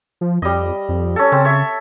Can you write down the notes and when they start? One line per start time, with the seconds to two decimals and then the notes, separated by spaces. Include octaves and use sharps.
0.21 F3
0.42 F2 G3 D#5
0.89 F2
1.16 C#4 A4
1.32 C#3 C4
1.45 C#5 E5